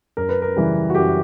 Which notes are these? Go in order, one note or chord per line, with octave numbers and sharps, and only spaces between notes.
F#2 A#4
B4
A#4
C#3 E3 G3
F#4
F#2 G4